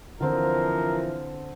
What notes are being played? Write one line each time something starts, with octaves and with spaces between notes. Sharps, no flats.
D3 E3 F3 C4 A#4